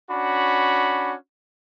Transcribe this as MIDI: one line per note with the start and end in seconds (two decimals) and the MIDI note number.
0.10 1.14 61
0.10 1.14 62
0.10 1.14 66
0.10 1.14 83